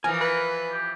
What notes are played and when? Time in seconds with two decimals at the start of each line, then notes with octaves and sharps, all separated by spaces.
0.04 E3 F3 A#4 G#5
0.21 B4
0.71 G4